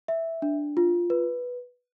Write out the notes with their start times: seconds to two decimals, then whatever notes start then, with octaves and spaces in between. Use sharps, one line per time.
0.08 E5
0.42 D4
0.77 F4
1.10 B4